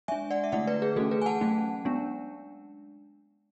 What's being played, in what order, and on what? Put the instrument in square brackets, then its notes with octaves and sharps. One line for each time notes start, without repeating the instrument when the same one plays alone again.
[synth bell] G#3 D4 E5 G#5
D5 F#5
E5
D3 A3 E4 D5 F#5
B4 D5
G#4 B4
E3 A3 C#4 F#4 A4
G#4 B4
G#5
F#5 A5
F#3 A3 C#4
G#3 B3 D4